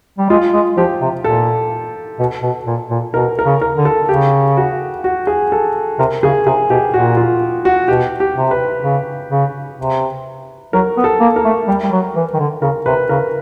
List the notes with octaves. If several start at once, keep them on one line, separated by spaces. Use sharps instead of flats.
G3
G#3 F4
G#3
F3 G4
C3
A#2 A4
B2
B2
A#2
A#2
B2 A#4
A#4
C#3
A#4
D3
A4
C#3 G4
F#4
F#4
G#4
A4
C3 A#4
C#3 G#4
C3 G#4
B2 G4
A#2 F#4
F4
F#4
B2 G4
G4
C3
B4
C#3
C#3
C3
F#3 A#4
B3
A4
A#3
A#4
A3
G3
G3
F#3
E3
D#3
D3
C#3 A#4
C3 B4
C#3 A#4